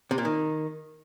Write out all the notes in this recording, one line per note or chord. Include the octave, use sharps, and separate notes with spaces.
C3
A#2
D#3